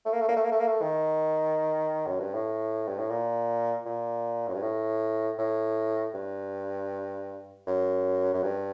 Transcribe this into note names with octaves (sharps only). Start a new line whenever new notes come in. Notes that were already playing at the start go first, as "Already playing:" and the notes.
A3
A#3
A3
A#3
A3
A#3
A3
A#3
A3
D#3
F#2
G2
A2
G2
A2
A#2
A#2
F#2
G2
A2
A2
G2
F#2
F#2
G2